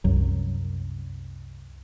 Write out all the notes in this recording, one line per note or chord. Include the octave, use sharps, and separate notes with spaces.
C2 F#2 F#3